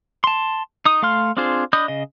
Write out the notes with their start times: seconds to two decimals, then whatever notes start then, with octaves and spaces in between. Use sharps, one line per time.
0.24 A5 C6
0.86 D#4 D#6
1.02 A3 F5 C6 F6
1.37 C4 D4 F4 G#4 C5
1.73 D4 D#5 B5 D#6 G6
1.88 C#3 D#5